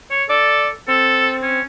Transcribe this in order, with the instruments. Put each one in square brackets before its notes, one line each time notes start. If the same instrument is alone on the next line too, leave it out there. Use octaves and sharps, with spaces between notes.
[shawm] C#5
[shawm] A4 [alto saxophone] D5
[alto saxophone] C4 [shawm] A4
[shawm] C#4